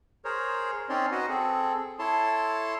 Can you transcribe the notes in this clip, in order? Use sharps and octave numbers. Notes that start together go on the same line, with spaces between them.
G#4 A#4 C5 C#5
C4 C#4 D#4 C#5 D5 C6
F#4 B4 D#5 F#5
C4 G#4 A4
E4 A4 C#5 A5 C6